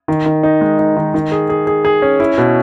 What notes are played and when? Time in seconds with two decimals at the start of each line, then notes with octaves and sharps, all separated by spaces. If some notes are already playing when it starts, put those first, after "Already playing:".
0.08 D#3
0.26 D#3
0.43 D#4
0.61 G#3
0.79 D#4
0.96 D#3
1.14 D#3
1.32 G#4
1.49 G#4
1.67 G#4
1.85 G#4
2.02 C#4
2.20 E4
2.38 B2